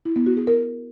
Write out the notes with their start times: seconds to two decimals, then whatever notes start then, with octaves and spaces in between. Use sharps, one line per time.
0.05 E4
0.16 B3
0.26 F#4
0.37 G#4
0.47 A#4